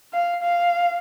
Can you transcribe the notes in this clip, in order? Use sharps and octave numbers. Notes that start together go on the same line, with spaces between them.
F5
F5